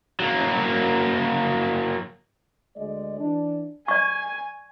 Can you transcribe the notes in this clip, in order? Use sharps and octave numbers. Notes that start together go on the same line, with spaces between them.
F#3 A#3
D2 G#3 D5 D#5
E3 D4
D5 G#5 C#6